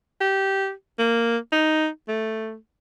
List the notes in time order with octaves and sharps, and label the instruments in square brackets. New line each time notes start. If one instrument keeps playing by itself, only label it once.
[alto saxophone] G4
A#3
D#4
A3